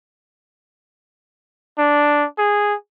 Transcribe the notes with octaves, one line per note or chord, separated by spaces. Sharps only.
D4
G#4